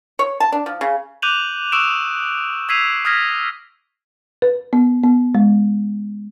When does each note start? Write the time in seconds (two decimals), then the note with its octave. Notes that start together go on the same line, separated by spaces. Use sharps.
0.19 C#5
0.40 A5
0.52 D4
0.66 F3
0.81 C#3
1.22 D6 F#6 G6 D#7 F7 F#7
1.72 C#6 D#6 E6 F#6 D7 E7
2.69 E6 G#6 B6 C7 D#7 F7
3.05 D#6 F6 G#6 A#6 B6
4.42 B4
4.73 B3
5.04 B3
5.35 G#3